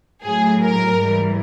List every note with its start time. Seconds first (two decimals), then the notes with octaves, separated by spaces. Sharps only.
0.23 A2 F#3 G#4
0.61 A#4
0.98 G#2 E3 G3